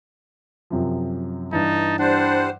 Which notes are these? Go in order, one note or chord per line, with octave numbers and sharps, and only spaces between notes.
F#2 C3 F3
G2 E3 D#4 A5
G3 D4 C5 F#5